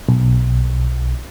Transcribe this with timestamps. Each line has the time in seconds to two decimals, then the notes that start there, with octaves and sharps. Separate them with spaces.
0.09 B1